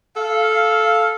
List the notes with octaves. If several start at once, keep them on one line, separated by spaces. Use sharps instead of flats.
A4 F5